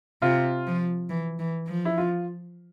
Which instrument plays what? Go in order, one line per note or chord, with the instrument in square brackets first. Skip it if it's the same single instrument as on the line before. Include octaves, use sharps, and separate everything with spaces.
[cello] C3 [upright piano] F4
[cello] F3
E3
E3
F3
[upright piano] E4
F4